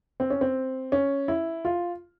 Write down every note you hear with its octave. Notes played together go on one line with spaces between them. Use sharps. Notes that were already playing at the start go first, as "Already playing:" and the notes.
C4
C#4
C4
C#4
E4
F4